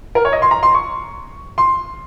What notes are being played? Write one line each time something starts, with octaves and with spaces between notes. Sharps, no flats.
A#4
C#5
D#5
C6
A#5
C6
C#6
C6